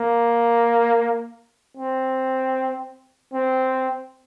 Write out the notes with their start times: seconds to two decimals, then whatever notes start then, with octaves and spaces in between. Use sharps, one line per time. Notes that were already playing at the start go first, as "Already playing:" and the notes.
Already playing: A#3
1.77 C4
3.34 C4